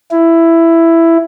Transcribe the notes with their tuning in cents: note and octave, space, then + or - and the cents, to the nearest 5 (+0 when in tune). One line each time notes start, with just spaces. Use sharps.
E4 +10